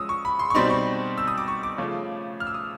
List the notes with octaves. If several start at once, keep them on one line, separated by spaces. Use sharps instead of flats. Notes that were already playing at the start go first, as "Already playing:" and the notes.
Already playing: F3 G#3 C#4 D#6 E6
C#6
B5
C6
C#6
B2 G3 C4 D#4 C6
C#6
E6
D#6
D6
C#6
D6
C#3 F3 A3
F6
E6
D#6